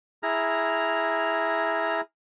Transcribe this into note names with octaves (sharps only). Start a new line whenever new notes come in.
E4 G#4 A#5 F6